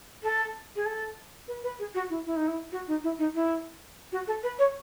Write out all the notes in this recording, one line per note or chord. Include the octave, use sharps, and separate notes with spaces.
A4
G#4
A4
B4
B4
G#4
F#4
E4
E4
D#4
E4
F#4
D#4
E4
D#4
E4
F#4
A4
B4
C#5